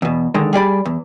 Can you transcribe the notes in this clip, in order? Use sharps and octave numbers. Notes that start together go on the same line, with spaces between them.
E2 B2
D3 D#3 G#3
G3 G#4 D5 B5
E2